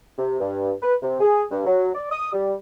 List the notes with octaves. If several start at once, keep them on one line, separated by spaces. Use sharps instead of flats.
C3
G2
B4
C3
G#4
G2
F#3
D5
D#6
G3